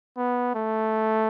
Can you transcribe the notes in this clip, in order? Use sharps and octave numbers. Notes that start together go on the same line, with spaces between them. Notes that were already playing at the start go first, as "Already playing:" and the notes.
B3
A3